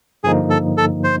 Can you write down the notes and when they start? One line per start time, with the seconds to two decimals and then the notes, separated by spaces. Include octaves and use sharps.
0.24 G2 D3 F3 A#3 D#4 G#4
0.50 A4
0.77 A4
1.04 C5